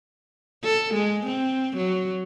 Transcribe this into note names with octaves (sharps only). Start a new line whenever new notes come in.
A4
G#3
C4
F#3